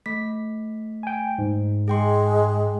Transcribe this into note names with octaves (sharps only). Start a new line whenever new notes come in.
A3 B6
G5 G#5
G#2
G#3 G#4 G5 C6